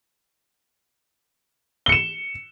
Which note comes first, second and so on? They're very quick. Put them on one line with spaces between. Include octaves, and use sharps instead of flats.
G7 C#7 E7